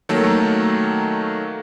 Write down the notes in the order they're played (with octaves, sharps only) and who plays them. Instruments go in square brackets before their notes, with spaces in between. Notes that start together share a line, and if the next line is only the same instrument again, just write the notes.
[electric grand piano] D#3 F#3 A3 A#3 A4